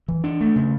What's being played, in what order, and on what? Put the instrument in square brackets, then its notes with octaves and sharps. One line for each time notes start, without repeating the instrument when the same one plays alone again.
[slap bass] E3
D4
A3
C#3